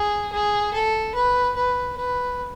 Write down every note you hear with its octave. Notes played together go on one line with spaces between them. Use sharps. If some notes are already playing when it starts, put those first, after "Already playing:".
Already playing: G#4
G#4
A4
B4
B4
B4